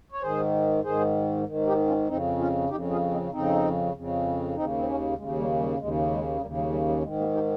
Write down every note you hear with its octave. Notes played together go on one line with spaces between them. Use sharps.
C#5
G#2 D#3 G#4 C5
G#2 D#3 G#4 C5
G#2 D#3
D#4 G4
C#4 F4
F2 C#3 C4 D#4
C#4 F4
F2 C#3 D#4 G4
F4 G#4
C4 D#4
F2 C#3 C4 D#4
F2 C#3
D#2 C#3 C4 D#4
C4
A#3 C#4
D#2 C#3 G#3
G3 A#3
G3
D#2 C#3 G#3
G#3
D#2 C#3 G3 A#3
G3 A#3
G3
G3
G#2 D#3 G#3
G3 A#3
D#4 G4